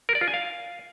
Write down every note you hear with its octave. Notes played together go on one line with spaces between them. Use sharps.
A#4
D5
F4
G#5
F5